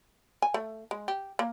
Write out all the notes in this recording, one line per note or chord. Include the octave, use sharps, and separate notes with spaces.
G#5
A3
G#3
G4
A#3